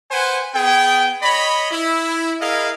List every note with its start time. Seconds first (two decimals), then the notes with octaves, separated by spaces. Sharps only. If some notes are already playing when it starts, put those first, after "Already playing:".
0.10 B4 C5 F#5 G#5
0.53 B3 G#4 G5
1.22 C#5 D#5 B5
1.71 E4
2.40 E4 G#4 A#4 D#5 F5